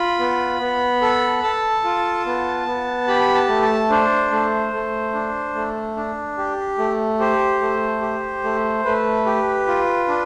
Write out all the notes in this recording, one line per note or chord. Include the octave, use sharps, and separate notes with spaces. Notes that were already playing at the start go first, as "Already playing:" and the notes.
Already playing: F4 B5
B3
B3
A4
A4 A5
F4
B3
B3
G4 B5
A5
A3
A5
D4 C5
A3
A3
D4
A3
D4
G4
A3
G4 C5
A3
G4
A3
A3 B4
G4
F4
D4